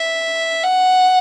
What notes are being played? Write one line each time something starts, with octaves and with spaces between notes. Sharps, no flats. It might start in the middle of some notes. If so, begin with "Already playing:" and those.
Already playing: E5
F#5